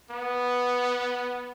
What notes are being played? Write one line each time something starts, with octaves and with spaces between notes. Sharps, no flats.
B3